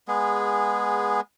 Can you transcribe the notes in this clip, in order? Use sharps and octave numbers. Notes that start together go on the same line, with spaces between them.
G#3 B3 G#4